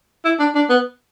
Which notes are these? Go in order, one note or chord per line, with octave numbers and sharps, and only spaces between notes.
E4
D4
D4
B3